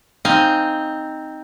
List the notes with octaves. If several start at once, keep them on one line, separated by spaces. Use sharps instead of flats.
C4 D#4 F5 G#5